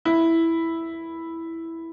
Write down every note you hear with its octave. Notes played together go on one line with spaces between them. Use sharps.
E4